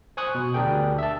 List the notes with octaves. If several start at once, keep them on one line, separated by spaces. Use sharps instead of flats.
C5 G#5 C#6 D#6 F#6
B2
D2 D4 G4 G#4 A#4 G5
E5 A5